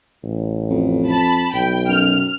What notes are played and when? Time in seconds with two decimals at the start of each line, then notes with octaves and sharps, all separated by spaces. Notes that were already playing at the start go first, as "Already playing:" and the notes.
0.24 A1
0.70 F2
1.08 A5 B5
1.54 B1 G5
1.89 F#2 F6